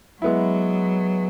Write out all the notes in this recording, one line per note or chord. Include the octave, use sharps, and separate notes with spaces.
F#3 G#3 B3 E4